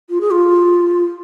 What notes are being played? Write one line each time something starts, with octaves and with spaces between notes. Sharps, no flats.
F4
G#4
F4